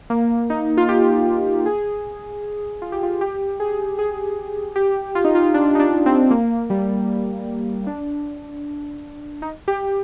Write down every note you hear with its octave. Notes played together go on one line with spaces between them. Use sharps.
A#3
D#4
F4
G4
G#4
F4
G4
F4
G4
G#4
G#4
G4
F4
D#4
F4
D4
D#4
D4
C4
A#3
G3
D4
D#4
G4